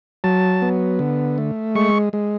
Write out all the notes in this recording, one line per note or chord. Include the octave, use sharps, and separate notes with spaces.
F#3 A5
B3
D3
A3
G#3 C#6
G#3